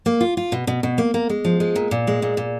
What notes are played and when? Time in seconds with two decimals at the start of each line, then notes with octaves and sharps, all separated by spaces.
0.06 A#3
0.21 F4
0.37 F4
0.52 B2
0.67 B2
0.83 B2
0.98 A#3
1.14 A#3
1.29 G#3
1.45 F3
1.60 G#3
1.76 A#2
1.91 A#2
2.07 G#3
2.22 A#2
2.37 A#2